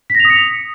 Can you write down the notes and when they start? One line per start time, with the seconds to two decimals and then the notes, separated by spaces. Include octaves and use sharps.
0.10 B6
0.15 A#6
0.20 F7
0.25 D#6
0.30 C#7